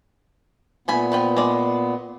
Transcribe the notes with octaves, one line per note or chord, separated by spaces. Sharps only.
A#2 A3 B3 G#5 B5
F3 B4 G5
G#3 D5